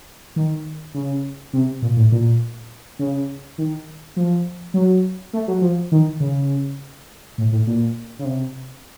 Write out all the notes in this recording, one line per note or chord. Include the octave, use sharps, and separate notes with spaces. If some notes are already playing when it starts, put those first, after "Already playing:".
D#3
C#3
C3
A#2
A2
A#2
C#3
D#3
F3
F#3
A3
F#3
F3
D#3
C#3
A2
A2
A#2
C#3
C3